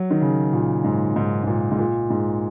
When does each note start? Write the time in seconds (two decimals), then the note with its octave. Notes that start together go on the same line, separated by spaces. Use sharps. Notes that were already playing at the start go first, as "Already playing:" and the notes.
Already playing: F#3
0.11 D#3
0.21 C#3
0.53 A#2
0.84 G#2
1.16 G#2
1.43 G#2
1.47 A#2
1.71 G#2
1.79 A#2
2.10 G#2